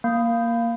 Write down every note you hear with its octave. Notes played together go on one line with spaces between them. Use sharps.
A#3